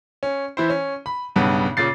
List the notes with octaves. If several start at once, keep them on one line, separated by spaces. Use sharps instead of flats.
C#4
E3 E4 C5
C#4
B5
B1 G2 C#3 B3
A#2 C#3 A6 C7